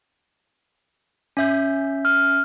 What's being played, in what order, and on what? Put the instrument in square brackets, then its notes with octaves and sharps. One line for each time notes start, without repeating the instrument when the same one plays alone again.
[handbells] C#4 E5 G6
[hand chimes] F6